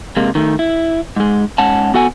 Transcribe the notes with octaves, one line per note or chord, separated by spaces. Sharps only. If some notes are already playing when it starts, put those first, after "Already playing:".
C3 G#3 A#3
D#3 A3
E4
G#2 G#3
G#2 C#4 F#5 A5
B3 F#4 A4 F#5 G#5